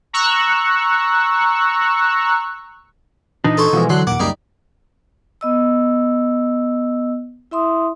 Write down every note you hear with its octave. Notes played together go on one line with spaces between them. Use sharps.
A#5 C#6 E6 F#6
A#2 E3 D4 D#4
A4 C5 C#5
B2 E3 F3 G#3
D3 F#3 C6 F#6
D#2 A#2 F#5 D6
C#2 F#2 G3 A#3 D#4
B3 D#5 E6
E4 E5 C6 D#6